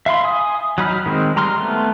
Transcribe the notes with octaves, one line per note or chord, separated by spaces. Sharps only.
E5 F5 B5 C6
G#5 D#6
F#3 D#4 B5 F6
D#3 G#3 C4
G3 A#5 C6 F6
A3 B3